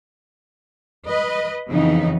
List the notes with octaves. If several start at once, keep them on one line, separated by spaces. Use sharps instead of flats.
B4 D#5
F2 C#3 E3 B3 D#4